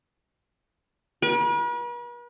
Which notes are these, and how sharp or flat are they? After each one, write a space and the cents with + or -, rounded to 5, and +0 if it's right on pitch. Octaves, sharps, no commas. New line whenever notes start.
B4 -45